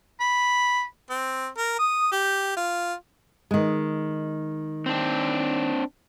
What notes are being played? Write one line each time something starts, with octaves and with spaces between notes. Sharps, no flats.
B5
C4
A#4
D#6
G4
F4
D#3 G#3
C4 D4